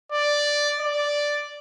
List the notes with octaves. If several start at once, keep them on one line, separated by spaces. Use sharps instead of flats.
D5
D5